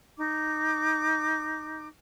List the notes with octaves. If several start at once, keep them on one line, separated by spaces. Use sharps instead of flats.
D#4 D6